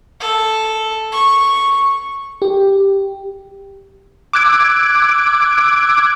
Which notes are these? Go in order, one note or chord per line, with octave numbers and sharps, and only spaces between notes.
A4
C#6
G4
D6 E6 F#6 G#6 D7